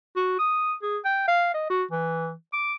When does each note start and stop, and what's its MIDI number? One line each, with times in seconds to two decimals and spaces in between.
0.16 0.36 66
0.39 0.74 87
0.82 0.98 68
1.05 1.25 79
1.28 1.52 77
1.54 1.70 75
1.70 1.84 66
1.91 2.33 52
2.53 2.74 86